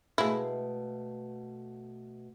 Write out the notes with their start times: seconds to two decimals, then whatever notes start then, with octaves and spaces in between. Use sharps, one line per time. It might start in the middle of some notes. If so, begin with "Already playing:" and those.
0.18 B2 G#3 A3 E4 F5